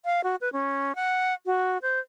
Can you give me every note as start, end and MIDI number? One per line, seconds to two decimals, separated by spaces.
0.05 0.21 77
0.24 0.36 66
0.41 0.52 71
0.53 0.95 61
0.95 1.34 78
1.46 1.78 66
1.82 1.99 72